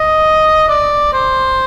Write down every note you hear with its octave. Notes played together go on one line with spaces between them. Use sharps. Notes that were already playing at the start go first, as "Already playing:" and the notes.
Already playing: D#5
D5
C5